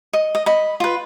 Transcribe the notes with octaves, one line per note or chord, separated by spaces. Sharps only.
D#5
D#5
D#5 B5
F4 B4